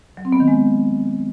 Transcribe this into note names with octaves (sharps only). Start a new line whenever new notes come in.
F#3
C4
B3
D#3
G#3